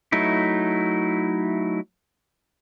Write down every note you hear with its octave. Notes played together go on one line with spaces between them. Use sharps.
F#3 A3 D#4 E4